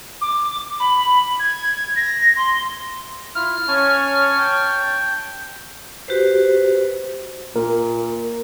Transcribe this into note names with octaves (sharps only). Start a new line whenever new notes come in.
D6
B5
G#6
A#6
C6
E4 F4 F6
C#4 C#5 G#5 A5 C#6
G5
F#4 G4 B4 C5
A#2 A#4